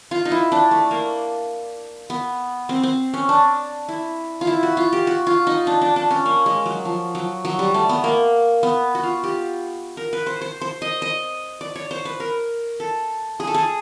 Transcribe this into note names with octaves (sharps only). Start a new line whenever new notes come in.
F4
D#4
E4
D4
A3
A#3
B3
C4
C4
C#4
D4
E4
F4
E4
F#4
F4
G4
F#4
F4
D#4
D4
D4
D4
C#4
A#3
G#3
F#3
F3
F#3
F#3
G3
A3
B3
A#3
B3
F#4
F4
G4
A#4
B4
C5
C5
C5
D#5
D#5
D5
C#5
C5
B4
A#4
A4
G#4
A4
G#4